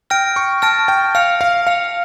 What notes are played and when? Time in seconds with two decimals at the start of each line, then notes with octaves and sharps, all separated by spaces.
0.10 G5 F6 A#6 D7
0.36 C#6
0.62 A5 F6 A#6 D7
0.88 G5
1.15 F5 F6 C#7 F7
1.41 F5
1.66 F5 F6 C#7 F7